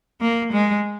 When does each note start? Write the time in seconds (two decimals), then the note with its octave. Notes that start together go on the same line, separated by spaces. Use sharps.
0.21 A#3
0.52 G#3